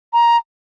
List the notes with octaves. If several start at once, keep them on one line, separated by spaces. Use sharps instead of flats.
A#5